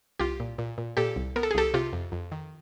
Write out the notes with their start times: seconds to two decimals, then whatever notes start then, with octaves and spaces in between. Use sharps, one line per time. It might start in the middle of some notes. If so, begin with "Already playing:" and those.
0.19 C2 F4 G4
0.40 A#2
0.58 A#2
0.78 A#2
0.97 A#2 G4 A4
1.16 C2
1.36 B3 A#4
1.43 A4
1.51 G#4
1.55 C2 G4 A4
1.74 C3 F4 G4
1.93 F2
2.12 F2
2.32 D#3